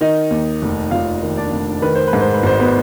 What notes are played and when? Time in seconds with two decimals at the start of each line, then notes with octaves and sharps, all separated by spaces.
0.01 D#3 D#4 D#5
0.31 D#2
0.62 F1
0.91 F1 F4 F5
1.23 D#3
1.37 D4 D5
1.53 F1
1.82 D#3 B4
1.95 C5
2.08 B4
2.13 G#2
2.21 C5
2.34 B4
2.43 G#1 C5
2.60 B3 B4